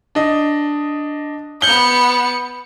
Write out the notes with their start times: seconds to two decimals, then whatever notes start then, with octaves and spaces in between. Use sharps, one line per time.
0.15 D4 D#5
1.62 B3 G6 C#7 F#7 G7